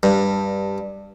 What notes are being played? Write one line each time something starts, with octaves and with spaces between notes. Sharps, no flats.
G2